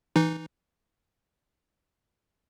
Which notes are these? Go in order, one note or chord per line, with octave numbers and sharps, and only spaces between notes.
E3 D#4